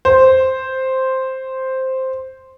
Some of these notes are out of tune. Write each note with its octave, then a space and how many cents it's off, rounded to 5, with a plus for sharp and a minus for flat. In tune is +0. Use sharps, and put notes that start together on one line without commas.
C5 +0